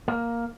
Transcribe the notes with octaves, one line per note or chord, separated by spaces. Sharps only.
A#3